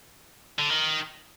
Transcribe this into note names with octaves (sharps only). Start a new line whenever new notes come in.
D3
D#3